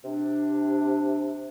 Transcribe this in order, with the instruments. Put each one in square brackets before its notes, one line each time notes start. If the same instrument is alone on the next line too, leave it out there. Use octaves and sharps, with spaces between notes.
[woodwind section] C3 D4